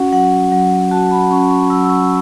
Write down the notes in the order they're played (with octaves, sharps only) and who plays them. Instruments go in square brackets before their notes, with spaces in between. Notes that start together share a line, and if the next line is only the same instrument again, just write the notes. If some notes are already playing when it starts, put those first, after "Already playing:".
Already playing: [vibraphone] C#4 F#4 F#5
F#3 F#5
F#3
F#4 A5
B5
C#4 C#6
C#6
F#3 E6
E6
C#6